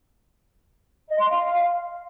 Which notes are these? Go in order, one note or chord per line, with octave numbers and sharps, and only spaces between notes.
D#5
C6
F5